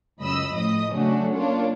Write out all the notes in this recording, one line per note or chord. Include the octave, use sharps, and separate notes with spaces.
C#2 F#2 D#5 B5 E6
A2 F3 D#5 D#6
C#3 F#3 A3 C#4 D4 F#4
A#3 D4 F4 C#5